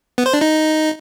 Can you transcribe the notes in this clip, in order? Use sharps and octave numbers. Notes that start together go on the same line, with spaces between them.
B3
C5
D4
D#4